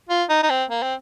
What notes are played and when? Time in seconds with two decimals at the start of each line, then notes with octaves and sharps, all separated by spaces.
0.09 F4
0.29 D#4
0.43 D#4
0.50 C4
0.70 A#3
0.82 C4